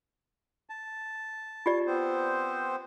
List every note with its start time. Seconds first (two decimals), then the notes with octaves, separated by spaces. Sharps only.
0.70 A5
1.66 F4 G4 D5
1.87 B3 C4 C5